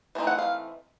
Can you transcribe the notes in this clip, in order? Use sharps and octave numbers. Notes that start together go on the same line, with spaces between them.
E3 A3 C4 D#4
F#5
F5